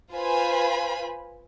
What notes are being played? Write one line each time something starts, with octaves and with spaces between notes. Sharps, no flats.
F4 B4 C5 F5 G#5 B5